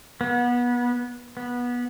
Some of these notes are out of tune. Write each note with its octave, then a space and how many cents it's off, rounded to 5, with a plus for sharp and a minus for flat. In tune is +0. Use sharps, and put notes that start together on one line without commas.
B3 -25
B3 -20